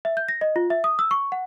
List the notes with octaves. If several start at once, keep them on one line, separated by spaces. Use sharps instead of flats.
E5
G6
A#6
D#5
F4
E5
D#6
E6
C#6
F#5